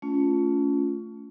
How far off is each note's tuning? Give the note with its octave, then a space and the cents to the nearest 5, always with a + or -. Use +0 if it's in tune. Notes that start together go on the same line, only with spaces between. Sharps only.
A3 +0 C#4 +25 F4 +0